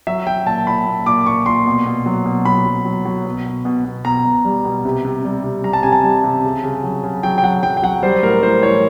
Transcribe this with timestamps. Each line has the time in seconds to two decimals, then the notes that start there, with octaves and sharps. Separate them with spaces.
0.07 F#3 E5
0.26 F#3 G5
0.46 A#2 A5
0.66 A#2 B5
0.86 A#2
1.06 A#2 D6
1.26 A#2 C#6
1.46 A#2 C6
1.66 B2
1.86 B2
2.06 F#3
2.26 B2
2.45 F#3 B5
2.66 F#3
2.85 F#3
3.05 F#3
3.25 B2
3.45 B2
3.65 B2
3.85 B2
4.05 B2 A#5
4.25 B2
4.45 G3
4.65 B2
4.85 C3
5.05 C3
5.24 G3
5.44 C3
5.64 G3 A#5
5.73 A5
5.83 C3 G#5
5.92 A5
6.04 G3
6.24 C3
6.44 C#3
6.63 C#3
6.83 F#3
7.03 C#3
7.23 F#3 G5
7.38 G5
7.43 F#3 F#5
7.63 F#3 G5
7.77 G5
7.83 F#3 F#5
8.02 G3 C5
8.23 A2 A#4
8.43 A2 C5
8.62 E3 C#5